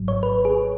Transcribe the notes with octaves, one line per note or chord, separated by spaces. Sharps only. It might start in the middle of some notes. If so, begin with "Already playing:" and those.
Already playing: G#1 G#2 F#3
C#5
B4
G#4